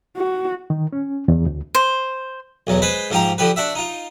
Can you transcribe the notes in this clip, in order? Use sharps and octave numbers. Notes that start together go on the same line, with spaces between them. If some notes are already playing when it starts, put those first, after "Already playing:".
F#4
D#3
C#4
E2
D2
C5
B1 E2 F#3
G#3 B4 C5 B5
G#2 F3 F4 G4 A#5
D3 F3 G4 B4
D4 F#4 E5
D#4 F4